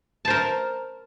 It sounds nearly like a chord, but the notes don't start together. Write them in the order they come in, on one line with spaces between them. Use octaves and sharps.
A5 C5 A#4